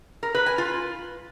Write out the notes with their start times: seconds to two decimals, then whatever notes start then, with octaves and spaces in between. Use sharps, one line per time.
0.23 A#4
0.35 B4
0.46 G#5
0.58 F4